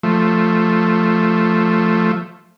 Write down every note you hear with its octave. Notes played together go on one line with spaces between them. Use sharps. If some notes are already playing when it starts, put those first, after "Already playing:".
F3 A3